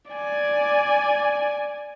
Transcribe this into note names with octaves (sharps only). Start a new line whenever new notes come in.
D5 G#5